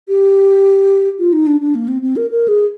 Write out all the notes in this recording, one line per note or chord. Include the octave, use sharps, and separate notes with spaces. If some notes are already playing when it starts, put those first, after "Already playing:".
G4
F4
D#4
D4
D4
A#3
C4
C4
A#4
A#4
G#4